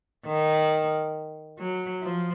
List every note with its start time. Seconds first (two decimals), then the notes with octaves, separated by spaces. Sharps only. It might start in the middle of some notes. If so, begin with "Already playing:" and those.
0.26 D#3
1.59 F#3
2.03 F3